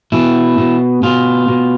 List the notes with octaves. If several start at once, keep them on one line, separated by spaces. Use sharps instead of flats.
B2 E4
B2
B2 F4
B2